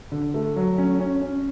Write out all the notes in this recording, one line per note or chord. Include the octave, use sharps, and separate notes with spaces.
D3
A3
F#3
C#4
C#4
C#4